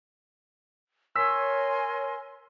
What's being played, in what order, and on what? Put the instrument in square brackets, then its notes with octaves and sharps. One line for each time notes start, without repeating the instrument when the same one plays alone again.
[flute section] A#4 G#5 C6 [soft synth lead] C#5 [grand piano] E6 B6